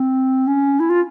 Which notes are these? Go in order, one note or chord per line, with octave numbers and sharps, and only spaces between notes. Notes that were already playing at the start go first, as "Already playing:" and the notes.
Already playing: C4
C#4
E4
F4